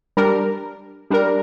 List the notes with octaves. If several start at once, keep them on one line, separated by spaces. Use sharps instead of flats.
G3 D4 A#4
G3 D4 A#4